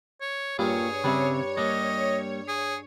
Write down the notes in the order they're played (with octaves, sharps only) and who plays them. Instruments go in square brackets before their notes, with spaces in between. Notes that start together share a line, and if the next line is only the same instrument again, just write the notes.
[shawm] C#5
[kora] G2 [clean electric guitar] A#3 F4 G4 [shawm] G#4 [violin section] C#5
[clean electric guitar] C#3 C4 E5 [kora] G3 D4
[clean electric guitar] G3 A#3 [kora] D4 [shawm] D#5
[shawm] G#4